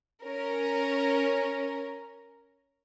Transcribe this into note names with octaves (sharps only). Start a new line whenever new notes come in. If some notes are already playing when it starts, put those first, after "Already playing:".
C#4 A#4